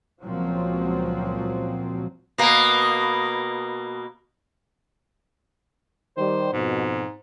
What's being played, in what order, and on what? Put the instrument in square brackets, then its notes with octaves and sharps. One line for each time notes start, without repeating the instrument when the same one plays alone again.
[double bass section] C#2 A#2 F3 F#3 C4
[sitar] B2 A#3
[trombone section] D#3 G3 [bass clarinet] C5
[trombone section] F2 B2 [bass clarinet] G#2